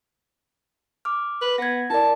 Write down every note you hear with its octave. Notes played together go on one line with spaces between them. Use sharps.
D6 F6
B4
B3 G#6 A#6
E4 A#4 D5 A5